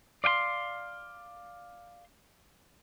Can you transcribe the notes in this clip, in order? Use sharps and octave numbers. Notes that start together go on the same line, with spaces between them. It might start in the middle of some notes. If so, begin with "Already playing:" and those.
D5 F5 G5 C6